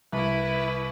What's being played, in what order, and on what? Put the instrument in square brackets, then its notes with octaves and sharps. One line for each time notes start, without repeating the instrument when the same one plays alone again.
[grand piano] C2 [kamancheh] E4 B4